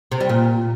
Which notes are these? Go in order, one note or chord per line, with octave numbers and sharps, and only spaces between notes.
C3
G3
A#2